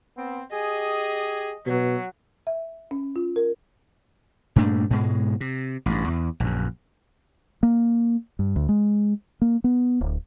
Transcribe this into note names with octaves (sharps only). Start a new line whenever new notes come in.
B3 C4
G4 G#4 D#5
B2 F#3
E5
C#4
F4
A#4
G2 A#2 A3 D4
G#2 B2 G#3
C3
A1 G2
E2
A#1 F#2
A#3
G2
D2
G#3
A#3
B3
D1